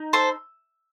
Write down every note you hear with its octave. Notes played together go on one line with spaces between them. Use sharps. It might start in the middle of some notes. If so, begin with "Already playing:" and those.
Already playing: D#4
A4 C5